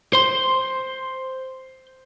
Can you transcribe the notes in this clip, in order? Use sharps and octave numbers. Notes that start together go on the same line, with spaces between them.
C5 C6